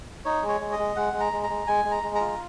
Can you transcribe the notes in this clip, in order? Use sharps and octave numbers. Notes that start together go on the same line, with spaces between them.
D#4 C#5
G#3
C#5
G#3
D#5
G#3
G#3 F#5
G#3
A#5
G#3
A#5
G#3
G#3 G#5
G#3
A#5
G#3
A#5
F4